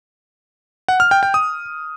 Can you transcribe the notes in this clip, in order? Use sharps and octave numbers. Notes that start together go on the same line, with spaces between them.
F#5
F6
G5
G5
D#6